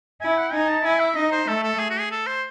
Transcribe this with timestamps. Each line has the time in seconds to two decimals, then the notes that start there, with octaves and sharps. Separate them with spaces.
0.21 E4 G#5
0.38 F#5
0.53 D#4 G#5
0.69 A5
0.85 E4 G#5
1.00 E5
1.16 D#4 D#5
1.32 C5
1.48 A3 A4
1.63 A4
1.79 G#4
1.90 F#4
2.00 G#4
2.11 A4
2.27 C5